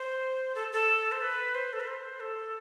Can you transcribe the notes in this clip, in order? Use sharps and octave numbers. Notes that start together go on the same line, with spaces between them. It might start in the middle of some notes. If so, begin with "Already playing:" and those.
Already playing: C5
A4
A4
C5
B4
C5
A4
B4
C5
A4